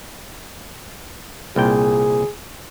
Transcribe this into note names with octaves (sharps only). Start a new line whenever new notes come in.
C2 A#2 G#4 G5